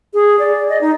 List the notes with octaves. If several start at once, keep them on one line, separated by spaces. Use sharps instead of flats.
G#4
D5
D#5
D#4